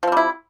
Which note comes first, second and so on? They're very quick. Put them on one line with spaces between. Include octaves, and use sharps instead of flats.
F3 C4 G3 E4